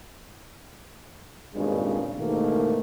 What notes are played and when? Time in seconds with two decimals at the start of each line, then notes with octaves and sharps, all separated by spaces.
1.55 G#1 C#2 G2 A#2 C#3 G#3
2.18 G#2 B2 D#3 E3 A3 A#3